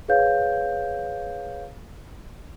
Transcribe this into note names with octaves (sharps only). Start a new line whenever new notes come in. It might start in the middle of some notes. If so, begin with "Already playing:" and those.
G#4 B4 C#5 F5 G6